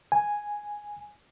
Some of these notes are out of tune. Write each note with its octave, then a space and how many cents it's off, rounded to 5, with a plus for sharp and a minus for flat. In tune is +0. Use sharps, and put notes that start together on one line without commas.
G#5 +0